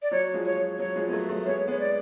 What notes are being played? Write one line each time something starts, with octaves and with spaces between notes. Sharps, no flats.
D5
F#3 C#5
F3 G#3
C#5
F#3
F#3 C#5
F3 G#3
B3
F#3 A3
F#3 A3
G#3 B3 C#5
G#3 B3 C#5
D5